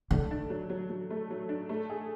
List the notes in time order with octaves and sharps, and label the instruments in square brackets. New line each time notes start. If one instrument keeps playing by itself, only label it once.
[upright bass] D3 [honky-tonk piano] A3
[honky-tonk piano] D4
F#3
F#3
F#3
A3
F#3
D4
A3
G#4